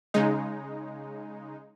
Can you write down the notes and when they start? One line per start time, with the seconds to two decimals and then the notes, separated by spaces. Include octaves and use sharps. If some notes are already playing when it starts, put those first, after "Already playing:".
0.14 C#3 G#3 D#4